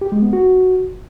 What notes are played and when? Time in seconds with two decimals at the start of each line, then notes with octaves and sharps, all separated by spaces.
0.01 G4
0.12 G#3
0.22 B3
0.33 F#4